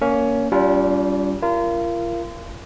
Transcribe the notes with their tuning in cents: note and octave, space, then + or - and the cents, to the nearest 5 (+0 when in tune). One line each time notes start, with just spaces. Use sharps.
A#3 +0 C#4 +15
G3 -15 C#4 +45 F4 +0
F4 -35 A#4 +0